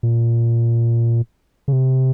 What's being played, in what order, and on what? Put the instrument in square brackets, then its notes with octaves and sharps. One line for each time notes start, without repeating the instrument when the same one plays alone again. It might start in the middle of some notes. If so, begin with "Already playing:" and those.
[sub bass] A#2
C#3
C3